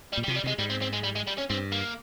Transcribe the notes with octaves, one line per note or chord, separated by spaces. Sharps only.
G3
A#2
G3
C3 F3
G3
C3 G#3
G#2 G3
C4
C4
G#3
G3
G#3
G3
C#4
G2 C4
A#3